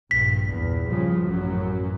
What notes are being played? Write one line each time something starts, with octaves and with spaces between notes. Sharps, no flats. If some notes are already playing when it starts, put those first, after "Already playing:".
A#1 G2 B6
E2 A#2
C#3 F3 G3
A1 F#2 F#3